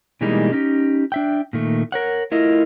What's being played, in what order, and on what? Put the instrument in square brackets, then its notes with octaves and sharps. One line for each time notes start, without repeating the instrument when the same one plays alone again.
[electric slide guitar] B2 E3 G3 G#3 A#3 D#4
C#4 D#4 G4
D4 E5 G5
A#2 D#3 A3
A#4 C#5 F#5
A3 E4 F4 A#4 D#5